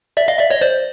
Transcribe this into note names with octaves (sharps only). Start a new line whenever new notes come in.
D5 E5
D#5 F5
D5 E5
C#5 D#5
C5 D5